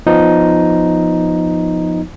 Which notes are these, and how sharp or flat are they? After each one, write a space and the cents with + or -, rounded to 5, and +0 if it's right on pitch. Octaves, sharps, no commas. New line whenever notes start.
F3 +0 B3 +0 D#4 +0